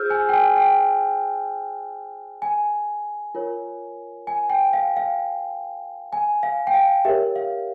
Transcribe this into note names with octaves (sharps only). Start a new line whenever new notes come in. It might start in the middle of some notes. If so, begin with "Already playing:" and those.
Already playing: F4 G#4 C5 E6 F6 G6
G#5
G5
G#5
G5
G#5
F4 A#4 C#5
G#5
G5
F5
F5
G#5
F5
G5
F5
G4 A#4 C#5 E5
F5